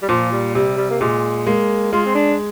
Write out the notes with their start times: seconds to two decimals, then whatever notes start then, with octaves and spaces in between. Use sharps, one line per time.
0.02 G3
0.09 A#2 F3
0.32 G3
0.55 C3 G3
0.77 G3
0.91 A#3
1.00 A#2 G#3
1.46 G#3 A#3
1.92 G#3 F4
2.06 C4
2.14 D4